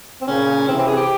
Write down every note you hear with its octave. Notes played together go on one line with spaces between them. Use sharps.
C4
A#2 C#3 C#4
C3 E3 C4
C4
G#4
G4